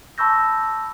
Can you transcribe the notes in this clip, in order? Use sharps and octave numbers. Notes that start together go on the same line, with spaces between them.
A5 B5 C#6 E6 G6 A#6